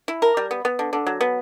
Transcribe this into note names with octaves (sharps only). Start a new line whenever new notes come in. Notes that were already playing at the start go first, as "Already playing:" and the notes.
E4
A#4
G3
B3
B3
D3
D3
F#3
B3